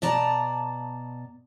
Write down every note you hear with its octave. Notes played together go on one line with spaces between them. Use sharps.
B2 D5 A5 A#5